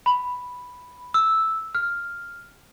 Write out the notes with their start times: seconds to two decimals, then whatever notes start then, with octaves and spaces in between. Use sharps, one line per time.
0.06 B5
1.14 E6
1.75 F6